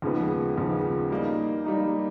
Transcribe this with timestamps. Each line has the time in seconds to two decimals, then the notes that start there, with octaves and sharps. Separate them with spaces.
0.02 D#2 C#3 F3 G#3 B3
0.57 D#2 C#3 F3 G#3 B3
1.10 G3 A#3 D#4
1.65 G3 A#3 D#4